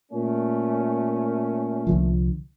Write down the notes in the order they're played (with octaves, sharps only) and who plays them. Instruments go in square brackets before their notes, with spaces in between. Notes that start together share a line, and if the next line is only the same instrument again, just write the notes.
[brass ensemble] A#2 A3 C#4
[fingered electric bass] C2 D3 F3